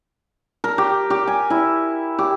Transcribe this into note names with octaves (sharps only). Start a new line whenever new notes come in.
A#4
G4
G4
G#5
E4
G4